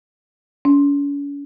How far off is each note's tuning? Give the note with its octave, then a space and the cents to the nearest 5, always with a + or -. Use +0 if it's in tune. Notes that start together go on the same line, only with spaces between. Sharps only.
C#4 +40